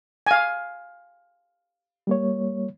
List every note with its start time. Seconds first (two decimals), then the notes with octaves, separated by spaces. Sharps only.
0.27 F5 G#5
2.07 G3 A#3 C#5